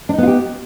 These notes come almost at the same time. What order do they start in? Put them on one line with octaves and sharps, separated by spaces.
D4 D#4 B3 F4 G4